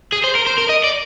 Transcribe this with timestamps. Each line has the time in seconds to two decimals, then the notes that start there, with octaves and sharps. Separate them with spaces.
0.12 G#4
0.24 C5
0.35 A#4
0.47 C5
0.58 A#4
0.69 D#5
0.84 D5